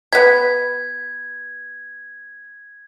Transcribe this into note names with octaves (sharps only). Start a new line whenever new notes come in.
B3 B5 G#6